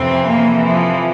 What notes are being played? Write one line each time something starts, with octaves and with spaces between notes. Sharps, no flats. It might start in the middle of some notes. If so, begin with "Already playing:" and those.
Already playing: F2 C3 E3 C4
A#3
F3